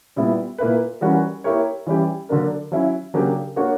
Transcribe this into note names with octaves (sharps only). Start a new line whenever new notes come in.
A#2 G3 B3 E4
A#2 A#3 E4 B4
E3 G3 C#4 F#4 A#4
A#3 E4 G4 A#4 C#5
E3 G3 C#4 E4 G4
D3 F#3 A#3 D4 A#4
F#3 C#4 E4
C#3 F#3 A#3 D4 G4
A#3 D4 F#4 A#4 C#5